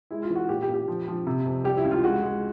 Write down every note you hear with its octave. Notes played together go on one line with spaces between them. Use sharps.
G#3 E4
F4
E3
F#4
A#2 G4
G4
A#2
G4
F3
F3
C3
F2
G3 G4
E4
C#2
F4
G#3 F#4
G#3